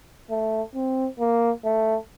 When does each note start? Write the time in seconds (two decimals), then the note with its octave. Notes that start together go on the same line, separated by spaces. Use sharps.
0.30 A3
0.75 C4
1.19 A#3
1.65 A3